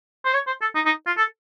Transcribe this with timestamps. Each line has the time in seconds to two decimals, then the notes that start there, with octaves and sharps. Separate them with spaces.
0.25 C5
0.34 C#5
0.47 C5
0.62 A4
0.75 D#4
0.86 D#4
1.07 F4
1.17 A4